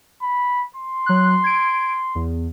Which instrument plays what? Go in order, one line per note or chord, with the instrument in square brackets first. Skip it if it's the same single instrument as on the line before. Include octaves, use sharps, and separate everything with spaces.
[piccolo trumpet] B5
C6
[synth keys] F#3 F#6
G#6 D7
E2